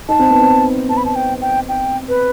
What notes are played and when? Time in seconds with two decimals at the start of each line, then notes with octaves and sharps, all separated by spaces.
0.09 D#4 A5
0.19 C4
0.31 B3
0.41 C4
0.89 B3 A5
0.97 B5
1.05 A5
1.15 G5
1.41 G5
1.69 G5
2.09 B4